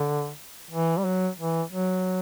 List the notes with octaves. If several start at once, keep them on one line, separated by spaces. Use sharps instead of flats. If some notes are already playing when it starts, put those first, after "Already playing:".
Already playing: D3
E3
G3
F#3
E3
F#3